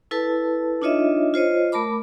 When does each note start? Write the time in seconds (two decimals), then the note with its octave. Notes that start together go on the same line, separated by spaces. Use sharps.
0.11 E4 A4 B4 A5
0.82 D4 D#4 F4 C#5 D#5 E5
1.34 F4 C5 C#5 D#5
1.72 A3 A#4 A5 B5 D6